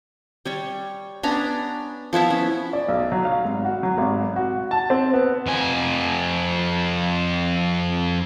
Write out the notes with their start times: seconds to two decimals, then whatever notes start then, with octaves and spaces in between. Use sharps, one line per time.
0.45 G3 C#5 C#6
1.23 B3 C#4 D4 A#5
2.13 F3 B3 E4 E5
2.30 C#4
2.73 D5
2.88 B1
3.12 F#3
3.25 F5
3.45 G#1
3.65 F#4
3.83 F#3
3.98 G#1
4.36 F#4
4.71 A5
4.90 C4
5.14 B3
5.47 F2 G#5